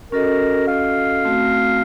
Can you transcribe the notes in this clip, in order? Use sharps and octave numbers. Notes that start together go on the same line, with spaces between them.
C#4 F#4 A4 A#4 D#5
F5
A3 C4 F#4